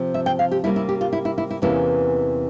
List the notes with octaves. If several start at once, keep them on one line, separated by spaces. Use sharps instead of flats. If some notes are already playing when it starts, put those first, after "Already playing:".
Already playing: C3 F3 C4
E5
G5
F5
G4
C3 G3 A#3 C#4 E4
E4
G4
F4
E4
E4
E4
E4
E2 C3 E3 A#3 C#4 E4